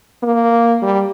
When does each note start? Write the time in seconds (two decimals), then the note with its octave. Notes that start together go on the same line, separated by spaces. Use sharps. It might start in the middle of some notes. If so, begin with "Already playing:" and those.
0.23 A#3
0.82 G3